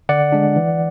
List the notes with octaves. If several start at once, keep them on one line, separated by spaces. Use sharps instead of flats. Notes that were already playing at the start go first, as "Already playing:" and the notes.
D3 D5 F#5
G#3 D4
E3